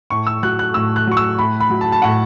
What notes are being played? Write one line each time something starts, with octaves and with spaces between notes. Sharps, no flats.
A2 C#6
E6
F#3 F#6
F#6
A2 E6
F#6
F#3 C#6
E6
A2 B5
B5
F#3
A5
A5
A2 F#5